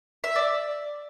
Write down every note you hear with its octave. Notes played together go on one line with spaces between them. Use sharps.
E5
D5